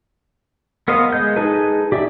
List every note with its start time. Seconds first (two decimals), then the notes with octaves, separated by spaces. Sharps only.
0.88 B3 A#4 C5 D#5 F5
1.13 G#3 G6
1.36 D#4 G#4 A4 B4
1.92 G4 D5 E5